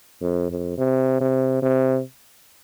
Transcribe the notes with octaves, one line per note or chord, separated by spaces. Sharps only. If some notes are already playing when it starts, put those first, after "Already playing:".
F2
F2
C3
C3
C3